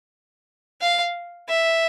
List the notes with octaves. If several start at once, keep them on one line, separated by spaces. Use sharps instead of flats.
F5
E5